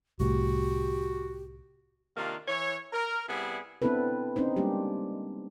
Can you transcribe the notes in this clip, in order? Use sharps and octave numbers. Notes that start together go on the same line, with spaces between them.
C2 A2 F#4 G4
C3 D#3 A#3 D4 F4
E3 C#5
A#4
C3 G3 B3 E4 G#4
B3 C4 D4 E4 A4 B4
C4 C#4 D#4 C5
G3 G#3 A#3 D4 G4